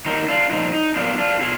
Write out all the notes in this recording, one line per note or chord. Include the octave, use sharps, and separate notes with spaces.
D#3 F#3 A#3 D#4
D4 F4
A#2 F3 G#3 D#4
D#4
A#2 F#3 B3 D4 F4
D4 F4
B2 F4 G#4